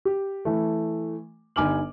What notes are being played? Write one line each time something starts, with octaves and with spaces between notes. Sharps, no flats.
G4
E3 A3
G1 D#4 G#5 D6 F6 F#7